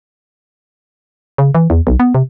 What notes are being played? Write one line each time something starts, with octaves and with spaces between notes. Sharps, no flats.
C#3
E3
E2
B1
B3
C3